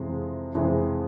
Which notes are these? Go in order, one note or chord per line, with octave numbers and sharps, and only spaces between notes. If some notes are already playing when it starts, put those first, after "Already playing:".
Already playing: F2 C3 E3 G#3
F2 C3 E3 G#3